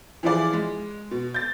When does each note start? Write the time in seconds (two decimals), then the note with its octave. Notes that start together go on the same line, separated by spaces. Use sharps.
0.23 E3 F3 E4 F4 G#4 D5
0.53 G#3
1.11 B2
1.34 G6 A6